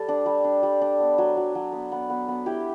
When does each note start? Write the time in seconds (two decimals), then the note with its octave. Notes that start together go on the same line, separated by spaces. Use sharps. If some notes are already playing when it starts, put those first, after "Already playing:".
Already playing: G3 A4
0.09 D4
0.26 G3
0.44 D4
0.63 G3
0.81 D4
1.00 B3
1.18 F#3
1.37 F#3
1.55 F#3
1.73 B3
1.92 B3
2.10 B3
2.28 B3
2.46 E4 G4